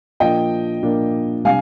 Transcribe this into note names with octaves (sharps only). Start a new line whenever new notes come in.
A#2 F3 A#3 D4 D#5 G5
A#2 F3 A#3 D4
C3 G3 D4 F5 G#5